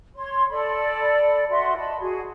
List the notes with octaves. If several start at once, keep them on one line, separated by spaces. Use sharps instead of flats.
C#5 C6
A4 D5 B5
F#4 E5 C6
D#5 A5 B5
F#4 G#4